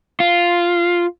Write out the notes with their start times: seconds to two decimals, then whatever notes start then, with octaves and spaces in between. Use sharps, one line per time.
0.20 F4